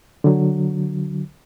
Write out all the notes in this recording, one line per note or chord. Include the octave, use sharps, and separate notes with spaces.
D3 F#3